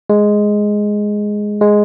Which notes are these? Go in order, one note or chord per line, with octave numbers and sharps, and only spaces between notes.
G#3
G#3